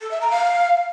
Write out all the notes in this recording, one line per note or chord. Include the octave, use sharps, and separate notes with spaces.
A4
E5
A#5
F5